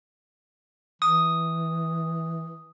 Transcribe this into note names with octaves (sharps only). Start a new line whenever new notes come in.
E3 D#6